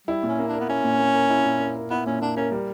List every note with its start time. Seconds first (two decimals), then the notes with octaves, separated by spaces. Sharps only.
0.07 G3 E4
0.23 A#2
0.28 C#4
0.39 A#3
0.48 D4
0.53 A#4
0.60 B3
0.69 C#4 E4
0.84 A#2
1.00 A#3
1.15 A#4
1.30 E4
1.45 A#2
1.60 A#3
1.75 A#4
1.90 B3 E4
2.06 A#2 C#4
2.21 A#3 D4
2.37 C#4 A#4
2.51 G3